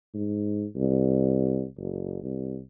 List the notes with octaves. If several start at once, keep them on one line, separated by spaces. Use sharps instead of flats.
G#2
C2
F#1
C2